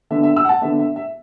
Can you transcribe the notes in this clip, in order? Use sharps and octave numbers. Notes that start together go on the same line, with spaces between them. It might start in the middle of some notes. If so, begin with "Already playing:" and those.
D3 B3 D4 E5
E5
E6
F#5
A5
D3 B3 D4 E5
E5
E5